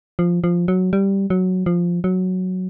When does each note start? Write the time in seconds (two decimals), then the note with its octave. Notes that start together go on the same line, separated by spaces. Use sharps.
0.19 F3
0.44 F3
0.68 F#3
0.93 G3
1.30 F#3
1.66 F3
2.04 F#3